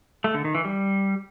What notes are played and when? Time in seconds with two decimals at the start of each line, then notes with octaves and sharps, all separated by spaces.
0.24 A3
0.34 D3
0.45 D#3
0.55 E3
0.65 G3